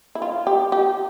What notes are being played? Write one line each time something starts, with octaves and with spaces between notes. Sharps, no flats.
E4
F4
G4
G4